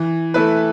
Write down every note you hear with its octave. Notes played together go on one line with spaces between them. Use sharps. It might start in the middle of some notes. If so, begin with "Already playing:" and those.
Already playing: E3
A3 E4 B4